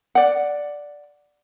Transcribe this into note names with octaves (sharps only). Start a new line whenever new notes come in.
D5 F#5